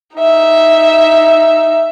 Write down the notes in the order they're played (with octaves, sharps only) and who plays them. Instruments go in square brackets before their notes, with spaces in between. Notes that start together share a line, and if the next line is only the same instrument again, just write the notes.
[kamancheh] D#4 E5